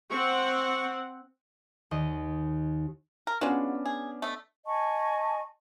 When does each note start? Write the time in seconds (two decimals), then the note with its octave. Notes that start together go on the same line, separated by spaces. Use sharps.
0.10 C4 F#5 C#6
1.91 D#2 D#5
3.27 A#4
3.41 G#3 B3 C#4 D4 F4 F#4
3.85 G#4
4.22 A3 D#5
4.66 D#5 G#5 A5 C#6